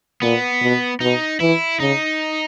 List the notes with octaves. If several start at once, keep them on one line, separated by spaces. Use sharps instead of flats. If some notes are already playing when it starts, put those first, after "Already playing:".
A#2 B3
B2
B2 D#4
E3 E4
C#3 D#4